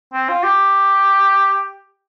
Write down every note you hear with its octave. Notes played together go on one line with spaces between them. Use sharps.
C4
F4
G4